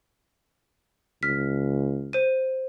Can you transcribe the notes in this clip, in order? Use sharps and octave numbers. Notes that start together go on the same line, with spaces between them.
C#2 F6 B6
C5 D#7